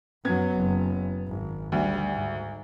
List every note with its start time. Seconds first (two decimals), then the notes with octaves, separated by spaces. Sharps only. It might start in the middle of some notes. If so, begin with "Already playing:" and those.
0.25 F#2 F#3 B3 G#6
0.56 F#1
1.28 G#1
1.72 D2 G3
2.13 G#2